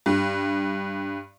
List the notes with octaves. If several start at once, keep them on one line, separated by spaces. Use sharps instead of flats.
G2